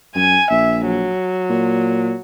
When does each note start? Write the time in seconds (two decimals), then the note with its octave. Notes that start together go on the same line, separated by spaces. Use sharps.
0.16 F#2 G#5
0.50 A#1 E5
0.87 F#3
1.50 A#2